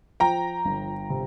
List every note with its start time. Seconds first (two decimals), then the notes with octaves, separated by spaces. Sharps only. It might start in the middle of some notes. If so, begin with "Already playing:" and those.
0.20 F3 G5 A#5
0.65 G1
1.10 C3